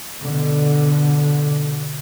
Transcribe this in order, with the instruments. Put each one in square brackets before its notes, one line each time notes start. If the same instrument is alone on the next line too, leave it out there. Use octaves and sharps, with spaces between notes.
[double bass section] B2 D3